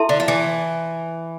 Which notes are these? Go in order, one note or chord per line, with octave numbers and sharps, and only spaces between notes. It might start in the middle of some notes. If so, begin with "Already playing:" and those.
Already playing: E4 A4 E5 A5 C6
D3
F3
E3